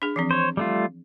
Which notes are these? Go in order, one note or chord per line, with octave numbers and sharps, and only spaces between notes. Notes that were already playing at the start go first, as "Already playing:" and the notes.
D4 G#4
E3 F3 C4
C5 C#5
G3 A3 F4